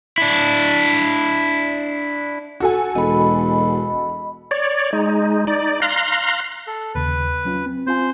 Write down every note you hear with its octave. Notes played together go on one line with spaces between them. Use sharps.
D4 E4
F#4 A4 G#5
E1 D#5 B5
C#5 D5
G#3 D#4
D#4 D5
F5 A#5 C6 F#6
A4
D#2 C#3 B4
F#3 C#4 F4
C4
C4 F4 C5 G#5